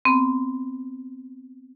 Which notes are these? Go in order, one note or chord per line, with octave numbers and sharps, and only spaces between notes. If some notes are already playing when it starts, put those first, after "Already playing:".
B3 C4